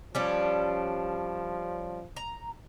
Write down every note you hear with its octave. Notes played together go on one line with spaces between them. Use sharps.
F3 G3 C#4 D4
A#5